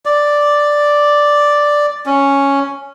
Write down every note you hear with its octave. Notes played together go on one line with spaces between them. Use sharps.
D5
C#4